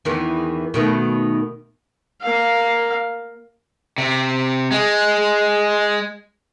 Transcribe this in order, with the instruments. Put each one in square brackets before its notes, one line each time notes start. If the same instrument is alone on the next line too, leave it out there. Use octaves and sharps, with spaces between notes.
[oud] E2 D#3 E3
B2 D#3 A3
[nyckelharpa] A#3 F5
[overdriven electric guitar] C3
G#3